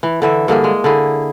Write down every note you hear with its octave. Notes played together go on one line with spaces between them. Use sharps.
E3
D3 E3 E5
G2 D3 A#3 G#4
G#3
D3 E4 G#4